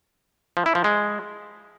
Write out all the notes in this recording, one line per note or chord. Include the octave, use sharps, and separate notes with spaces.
F3
E4
F3
G#3